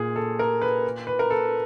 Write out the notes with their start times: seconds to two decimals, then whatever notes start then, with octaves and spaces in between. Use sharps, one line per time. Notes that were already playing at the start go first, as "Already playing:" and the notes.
Already playing: A#2 G#4
0.16 A4
0.39 A#4
0.62 B4
1.07 B4
1.19 A#4
1.30 A4